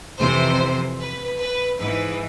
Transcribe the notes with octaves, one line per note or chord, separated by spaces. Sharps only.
F2 C3 E3 C5
B4
B4
G#2 E3 B4